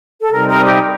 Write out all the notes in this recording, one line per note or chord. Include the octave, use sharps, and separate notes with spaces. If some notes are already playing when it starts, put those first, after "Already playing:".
A4
C3 G3 C4 D#4 A#4
A#4
G4